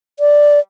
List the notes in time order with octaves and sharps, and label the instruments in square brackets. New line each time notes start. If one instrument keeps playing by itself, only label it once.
[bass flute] D5